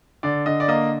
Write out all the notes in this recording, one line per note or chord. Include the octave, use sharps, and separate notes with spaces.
D3 D5
D3 D#5
D5
A#3 D#5